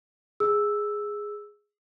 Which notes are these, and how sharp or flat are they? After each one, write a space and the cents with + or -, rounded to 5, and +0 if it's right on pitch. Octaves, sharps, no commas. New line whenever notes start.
G#4 +0 E6 +0